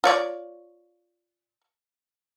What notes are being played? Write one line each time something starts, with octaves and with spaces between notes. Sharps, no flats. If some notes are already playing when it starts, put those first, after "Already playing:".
F4 C#5 D5